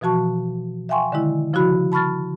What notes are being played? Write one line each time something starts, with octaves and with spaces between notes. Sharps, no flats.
B2 E3 F3 F#4 A5 C#6
E5 F5 G5 G#5 C6 C#6
D3 D#3 G#3 E4
C#3 F3 E4 F#4 B5
A5 B5 C#6 F6 A6